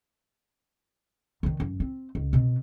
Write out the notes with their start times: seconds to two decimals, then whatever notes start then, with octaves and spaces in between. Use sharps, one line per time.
1.43 D3 D#3
1.60 F#2
1.80 C4
2.15 C#2
2.33 B2 C4